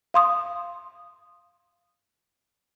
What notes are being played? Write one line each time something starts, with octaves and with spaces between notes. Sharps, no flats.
F5 C6 D#6